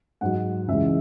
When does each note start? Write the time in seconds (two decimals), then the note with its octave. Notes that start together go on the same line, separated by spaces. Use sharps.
0.21 G#2 F#3 F#5
0.67 C#2 C#3 E3 G#3 E5